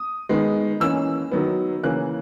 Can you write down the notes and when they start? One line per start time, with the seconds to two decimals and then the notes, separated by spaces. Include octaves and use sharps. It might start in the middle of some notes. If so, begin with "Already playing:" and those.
Already playing: D#6
0.29 D#3 G#3 B3
0.80 E3 A#3 C#4 E6
1.31 D#3 F#3 B3
1.83 C#3 E3 A#3 C#4 F#6